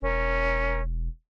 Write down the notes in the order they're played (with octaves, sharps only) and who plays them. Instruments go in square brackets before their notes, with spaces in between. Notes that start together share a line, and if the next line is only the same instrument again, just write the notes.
[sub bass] E1 [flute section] C#4 A#4